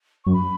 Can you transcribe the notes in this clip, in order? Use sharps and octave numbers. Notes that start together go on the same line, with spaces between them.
F#2 C#6
B5